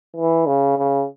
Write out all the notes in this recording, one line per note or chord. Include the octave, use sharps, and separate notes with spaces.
E3
C#3
C#3